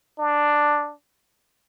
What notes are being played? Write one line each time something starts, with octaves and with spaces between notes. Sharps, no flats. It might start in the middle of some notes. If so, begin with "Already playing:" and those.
D4